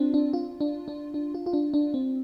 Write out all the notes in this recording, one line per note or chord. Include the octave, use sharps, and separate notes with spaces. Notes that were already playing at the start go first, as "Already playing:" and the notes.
Already playing: C4 D4 F4
D4
F4
D4
D4
D4
F4
F4
D4
D4
C4